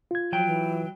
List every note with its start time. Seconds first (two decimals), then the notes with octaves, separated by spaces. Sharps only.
0.11 F4 G#6
0.32 F3 F#3 G5
0.46 E3